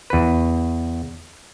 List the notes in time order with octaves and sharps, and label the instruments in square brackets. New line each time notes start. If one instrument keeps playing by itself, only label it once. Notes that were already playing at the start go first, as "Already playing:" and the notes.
[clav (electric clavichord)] E2 B4